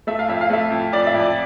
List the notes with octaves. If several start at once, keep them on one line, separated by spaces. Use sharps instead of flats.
A3 E5
F5
F2 E5
F5
A3 E5
F2
F2 D5
E5
F2
D5